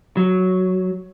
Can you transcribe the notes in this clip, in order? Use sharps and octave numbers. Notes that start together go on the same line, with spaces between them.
F#3